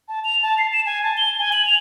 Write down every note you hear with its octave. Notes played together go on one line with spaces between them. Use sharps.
A5
F7
A5
C7
E7
G#5
A5
G7
G#5
F#7
F7